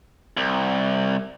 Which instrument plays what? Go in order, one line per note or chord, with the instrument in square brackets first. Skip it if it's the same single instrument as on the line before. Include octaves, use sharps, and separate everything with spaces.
[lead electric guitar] C2